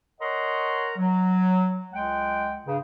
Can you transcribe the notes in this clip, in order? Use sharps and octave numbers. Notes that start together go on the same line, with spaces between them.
A#4 C#5 D#5 F#5 A#5 C6
F#3
C#2 G#3 F#5 G5
G2 C#3